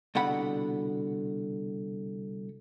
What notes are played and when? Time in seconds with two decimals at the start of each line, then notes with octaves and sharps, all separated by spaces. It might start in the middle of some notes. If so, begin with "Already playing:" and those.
0.15 C2 B2 D3 F#5 B5